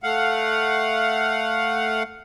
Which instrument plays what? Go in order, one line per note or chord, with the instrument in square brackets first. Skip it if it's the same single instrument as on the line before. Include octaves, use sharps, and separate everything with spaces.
[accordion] A3 F5 F#5